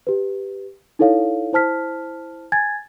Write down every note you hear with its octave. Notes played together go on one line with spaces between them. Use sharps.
G4 B4
D#4 E4 A4 C#5 F5
E4 C5 A5 F6 B6
G#5 G#6 A6